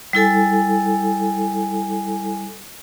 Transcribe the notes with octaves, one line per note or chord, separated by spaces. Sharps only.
G3 E4 A4 G#5